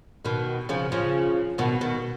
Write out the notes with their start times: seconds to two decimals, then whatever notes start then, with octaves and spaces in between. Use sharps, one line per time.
0.25 B2 D#3
0.69 C#3 F3
0.92 C#3 F3
1.58 B2 D#3
1.81 B2 D#3